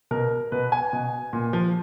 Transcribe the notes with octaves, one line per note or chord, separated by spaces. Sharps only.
B2 A#4
B2 B4
G#5
B2
A#2
F3